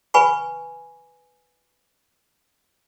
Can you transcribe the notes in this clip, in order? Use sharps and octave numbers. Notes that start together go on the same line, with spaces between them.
B4 G#5 B5 C#6